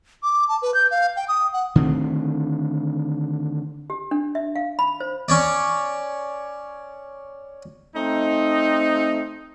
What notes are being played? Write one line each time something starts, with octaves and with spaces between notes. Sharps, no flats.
D6
A5
B4
G6
F5
G5
D#6
F#5
D3 D#3 A3 C4
G4
D4
E5
F5
B5
C5
C#4 C#5 D5
A3 C4 D#4